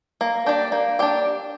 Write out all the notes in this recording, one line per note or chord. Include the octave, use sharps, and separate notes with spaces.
A#3
D4 G4 D5
A#3
D4 G4 D5